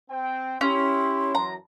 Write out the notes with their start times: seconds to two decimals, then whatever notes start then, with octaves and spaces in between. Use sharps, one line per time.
0.10 C4 G5
0.61 C#4 E4 G4 C6
1.35 F#2 E3 F#3 A#5